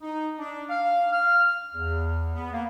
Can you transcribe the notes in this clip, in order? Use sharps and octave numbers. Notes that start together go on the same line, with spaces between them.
D#4
D4
F5
F6
E2
B3
A#3